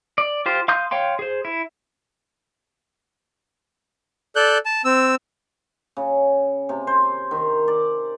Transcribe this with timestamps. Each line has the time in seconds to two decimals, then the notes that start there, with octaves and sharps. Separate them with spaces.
0.18 D5
0.46 F4 G4 C5
0.68 F5 C6 D#6 G6
0.91 C#5 F5 G5 C6
1.19 G#4 C5
1.45 E4
4.36 A4 D5 F#6 G6
4.65 A5
4.85 C4 E6
5.97 C#3
6.69 C3
6.87 C5
7.31 D#3
7.68 D5